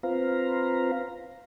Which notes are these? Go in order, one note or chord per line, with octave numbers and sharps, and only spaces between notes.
C4 F4 B4 C5 F5 A#5